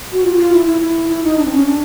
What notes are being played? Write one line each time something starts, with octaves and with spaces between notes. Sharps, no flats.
F#4
F4
F#4
F4
E4
E4
E4
E4
D#4
D4
C4
C#4
D4